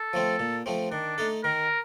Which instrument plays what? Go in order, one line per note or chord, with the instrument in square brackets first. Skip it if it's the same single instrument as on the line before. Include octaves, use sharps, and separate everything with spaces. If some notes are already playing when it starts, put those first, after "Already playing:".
Already playing: [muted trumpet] A4
[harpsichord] F3 A3 C4
A#2
F3 A3 C4
[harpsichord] D#3 [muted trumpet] D4
[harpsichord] A3 D#4 A4
[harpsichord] D#3 [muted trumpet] A#4